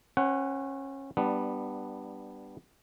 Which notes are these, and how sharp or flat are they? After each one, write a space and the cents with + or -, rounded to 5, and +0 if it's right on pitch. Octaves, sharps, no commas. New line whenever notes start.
C#4 -25 B4 +35 F#5 +10
G3 +0 B3 +0 D4 +20